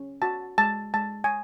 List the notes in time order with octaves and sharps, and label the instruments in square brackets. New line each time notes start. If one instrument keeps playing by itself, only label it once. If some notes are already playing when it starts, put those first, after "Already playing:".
Already playing: [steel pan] C#4
F#4 A5
G#3 A5
G#3 A5
G#5